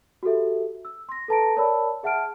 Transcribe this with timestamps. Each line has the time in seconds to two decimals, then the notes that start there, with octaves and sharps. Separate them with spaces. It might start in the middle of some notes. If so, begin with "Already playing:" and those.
0.23 F#4 G4 A4 E5
0.85 E6
1.09 C6 A#6
1.28 A4 B4 A5 A#5 A#6 D7
1.57 A#4 C#5 D5 A5 B5 E6
2.03 G#4 E5 F#5 A5 F6 D7